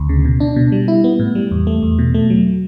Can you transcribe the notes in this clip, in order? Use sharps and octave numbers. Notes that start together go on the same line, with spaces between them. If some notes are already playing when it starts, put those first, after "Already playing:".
Already playing: D2
C#3
B2
D4
B2
G3
E4
B3
A2
G3
E2
A3
E2
B2
A3
F#3